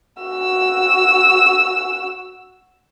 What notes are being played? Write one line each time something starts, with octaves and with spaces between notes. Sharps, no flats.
F#4 E6